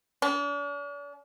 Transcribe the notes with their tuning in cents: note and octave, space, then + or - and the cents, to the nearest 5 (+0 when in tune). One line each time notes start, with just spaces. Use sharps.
D4 -45